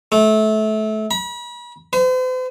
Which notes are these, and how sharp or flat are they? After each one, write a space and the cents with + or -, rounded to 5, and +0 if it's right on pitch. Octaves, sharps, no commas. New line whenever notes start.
A3 -25
B5 -40
C5 -45